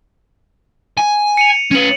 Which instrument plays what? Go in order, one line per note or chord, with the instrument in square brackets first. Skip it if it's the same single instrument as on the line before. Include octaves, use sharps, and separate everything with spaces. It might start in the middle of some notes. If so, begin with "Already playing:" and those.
[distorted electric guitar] G#5
[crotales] C#7 D#7 F7
[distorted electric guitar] C#4 B4 [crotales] D#7 F#7